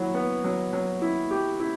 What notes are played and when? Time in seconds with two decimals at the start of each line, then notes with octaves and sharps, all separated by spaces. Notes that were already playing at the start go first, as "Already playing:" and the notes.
Already playing: F#3 E4
0.14 B3
0.44 F#3
0.73 F#3
1.02 E4
1.31 G4
1.60 E4